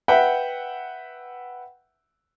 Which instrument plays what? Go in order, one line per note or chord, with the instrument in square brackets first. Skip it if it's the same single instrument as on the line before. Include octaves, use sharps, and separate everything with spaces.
[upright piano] B4 E5 F#5 G5